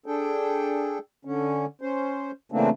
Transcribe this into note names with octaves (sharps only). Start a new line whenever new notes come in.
D4 G#4 A4 G5
D3 C#4
C#4 C5
C#3 E3 A3 A#3 C4 D4